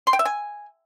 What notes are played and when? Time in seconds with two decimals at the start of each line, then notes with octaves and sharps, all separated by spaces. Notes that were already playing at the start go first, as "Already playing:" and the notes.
0.07 C6
0.13 G5
0.19 E5
0.25 G#5